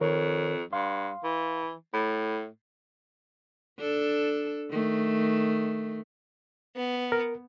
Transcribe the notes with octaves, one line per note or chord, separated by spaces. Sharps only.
F2 D#3 A#4 C#5
G2 F5 C6
E3
A2 B5
D4 A4
D#3 A3
B3
A#4